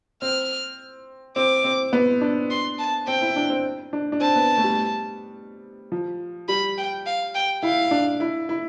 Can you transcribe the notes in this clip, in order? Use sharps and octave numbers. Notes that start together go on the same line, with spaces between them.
C4 F6
C4 D6
C4
B3
D4
C6
A5
C4 G5
E4
D4
C4
D4
D4
C4 A5
B3
A3
G3
F3
G3 B5
G5
F5
G5
E4 F5
D4
E4
E4